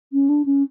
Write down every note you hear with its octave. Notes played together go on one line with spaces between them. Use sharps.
C#4
D4
C#4